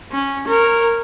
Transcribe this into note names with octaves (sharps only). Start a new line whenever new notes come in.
C#4
A#4 C#5